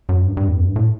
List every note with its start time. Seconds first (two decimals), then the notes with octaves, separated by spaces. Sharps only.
0.09 F#2
0.26 G2
0.37 G2
0.48 E2
0.60 F#2
0.68 G2
0.76 A2